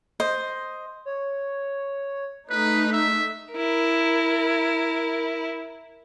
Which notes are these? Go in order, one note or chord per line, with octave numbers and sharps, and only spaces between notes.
C5 D#5
C#5
A3 D#4 B4 B6
E5
E4 A#4